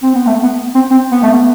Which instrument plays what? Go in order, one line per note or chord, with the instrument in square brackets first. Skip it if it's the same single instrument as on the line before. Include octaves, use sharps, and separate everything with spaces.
[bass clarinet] C4
B3
A3
B3
C4
C4
B3
A3
B3